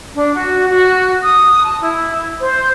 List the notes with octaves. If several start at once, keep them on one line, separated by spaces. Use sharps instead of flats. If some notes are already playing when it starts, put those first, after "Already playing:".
D4
F#4
F#4
D#6
A5
E4
C5